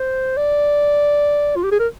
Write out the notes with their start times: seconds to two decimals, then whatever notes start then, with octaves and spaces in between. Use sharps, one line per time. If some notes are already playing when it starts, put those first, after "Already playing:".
Already playing: C5
0.37 D5
1.56 F4
1.64 G4
1.72 G#4
1.79 A#4